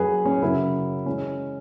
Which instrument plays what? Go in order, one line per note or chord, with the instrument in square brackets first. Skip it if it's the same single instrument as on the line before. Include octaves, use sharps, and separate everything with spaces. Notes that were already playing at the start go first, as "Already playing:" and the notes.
Already playing: [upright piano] F#2 F#3 G#4 B4
C#4
F#2 C#3 F#3 E4
E3 G#3 C#4